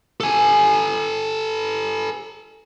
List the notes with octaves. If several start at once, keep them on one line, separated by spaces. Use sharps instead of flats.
A4 G#5